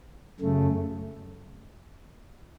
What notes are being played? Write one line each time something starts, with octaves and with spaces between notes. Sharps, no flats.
F#2 C#3 A3